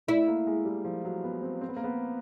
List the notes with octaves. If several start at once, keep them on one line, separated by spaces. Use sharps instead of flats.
A3 E4
A#3
G#3
G3
F3
F#3
B3
C4
C4
B3
A#3
B3